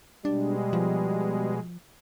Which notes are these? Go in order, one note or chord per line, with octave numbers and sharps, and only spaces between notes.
B2 G3 G#3 D4
F3